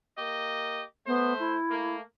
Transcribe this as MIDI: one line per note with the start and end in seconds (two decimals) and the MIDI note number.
0.17 0.82 58
0.17 0.82 67
0.17 0.82 75
1.07 1.56 57
1.07 1.33 59
1.07 1.56 72
1.39 1.96 64
1.69 2.00 57
1.69 2.00 58